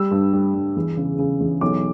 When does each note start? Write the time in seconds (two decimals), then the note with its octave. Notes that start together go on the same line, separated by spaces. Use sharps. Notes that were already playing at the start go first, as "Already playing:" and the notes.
Already playing: G3 E6
0.11 G2
0.33 G3
0.54 G2
0.76 E2
0.97 C#3
1.19 C#3
1.40 E2
1.61 B1 D6